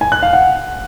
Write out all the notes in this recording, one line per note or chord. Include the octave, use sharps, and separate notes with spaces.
G#5
F#6
F5
F#5